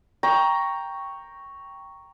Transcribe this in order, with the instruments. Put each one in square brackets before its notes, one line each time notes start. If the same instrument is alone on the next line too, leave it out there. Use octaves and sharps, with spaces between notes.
[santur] G5 A#5 C#6